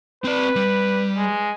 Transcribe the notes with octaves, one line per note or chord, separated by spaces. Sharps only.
C4 B4 D5
G3
G#3